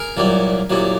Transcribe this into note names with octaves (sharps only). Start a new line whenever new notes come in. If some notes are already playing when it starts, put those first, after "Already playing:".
Already playing: G#4 A#4
C2 A#2 F#3
C2 A#2 F#3